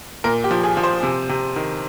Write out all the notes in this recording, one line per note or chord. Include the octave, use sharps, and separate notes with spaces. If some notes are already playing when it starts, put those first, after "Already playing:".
A#2 A#4
G4
F3
G#4
F3
C5
C3
C3
D#3